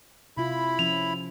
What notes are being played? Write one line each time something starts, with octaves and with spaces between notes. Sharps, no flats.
C3 E4 F4 B5
F3 C#4 F7